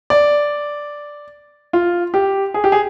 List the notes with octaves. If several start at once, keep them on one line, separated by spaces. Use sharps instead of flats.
D5
F4
G4
G#4
G4
G#4